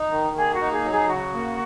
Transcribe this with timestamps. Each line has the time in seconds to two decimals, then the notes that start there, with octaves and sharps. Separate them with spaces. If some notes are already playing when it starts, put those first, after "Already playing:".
Already playing: D#4
0.11 D#3
0.36 A#3 G#4
0.54 F#4
0.61 D#4
0.72 G#4
0.84 F#3
0.91 G#4
1.09 C#3 F#4
1.34 A#3